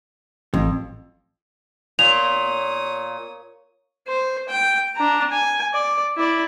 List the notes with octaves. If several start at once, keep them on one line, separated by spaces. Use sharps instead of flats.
A1 F2
A#2 C#5 D#6 F7
C5
G5
D4 A#5
G#5
D5
E4 D5